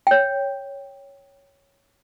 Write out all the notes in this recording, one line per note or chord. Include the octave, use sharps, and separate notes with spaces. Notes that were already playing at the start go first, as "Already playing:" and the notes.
C#5 G5